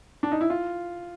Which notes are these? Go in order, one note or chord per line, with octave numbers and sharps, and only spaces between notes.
D4
D#4
E4
F4